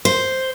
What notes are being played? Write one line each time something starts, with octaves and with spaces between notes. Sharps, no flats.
C5